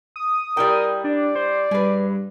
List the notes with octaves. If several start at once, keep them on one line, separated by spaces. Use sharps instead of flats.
D#6
G3 E4 A#4 G5
D4 D5
C5
G2 G#4 B4